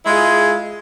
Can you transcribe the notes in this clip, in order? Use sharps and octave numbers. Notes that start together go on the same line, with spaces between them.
G#3 E4 F4 G#4